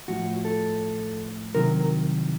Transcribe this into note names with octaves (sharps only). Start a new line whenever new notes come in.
A2 F3 F#4
A4
C2 C3 D#3 F#3 A#4